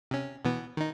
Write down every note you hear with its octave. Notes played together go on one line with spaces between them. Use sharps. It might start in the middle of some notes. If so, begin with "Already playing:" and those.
C3 C#4
B2 E3 B3
D#3 D#4